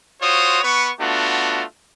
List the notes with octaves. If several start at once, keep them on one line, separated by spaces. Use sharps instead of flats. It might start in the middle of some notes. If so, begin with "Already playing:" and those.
F4 F#4 C5 C#5 D#6
B3 B4 C#6
A3 B3 D4 F4 F#4